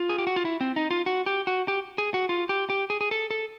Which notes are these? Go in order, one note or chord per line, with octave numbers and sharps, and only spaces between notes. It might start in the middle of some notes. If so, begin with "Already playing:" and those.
Already playing: F4
G#4
G4
F#4
F4
E4
C4
D#4
F4
F#4
G4
F#4
G4
G#4
F#4
F4
G4
G4
G#4
G#4
A4
A4